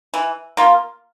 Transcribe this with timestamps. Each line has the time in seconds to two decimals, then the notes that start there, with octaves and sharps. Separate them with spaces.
0.14 E3
0.57 A#3 F4